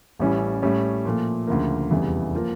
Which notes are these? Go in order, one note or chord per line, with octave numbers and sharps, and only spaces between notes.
A1 A2 G3 C#4 E4
A2 G3 C#4
A#2 F3 A3
D2 C#3 F3 A#3
F1 E2 C#3 E3 G3
F3 A#3